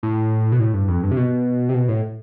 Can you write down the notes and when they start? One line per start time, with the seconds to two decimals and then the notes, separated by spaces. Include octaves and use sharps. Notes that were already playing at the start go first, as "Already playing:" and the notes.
0.03 A2
0.52 B2
0.59 A2
0.74 G2
0.88 F2
1.03 G2
1.11 C3
1.17 B2
1.69 C3
1.74 B2
1.88 A2